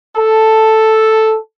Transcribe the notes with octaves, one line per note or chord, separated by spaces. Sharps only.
A4